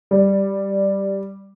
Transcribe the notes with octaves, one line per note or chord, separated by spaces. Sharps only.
G3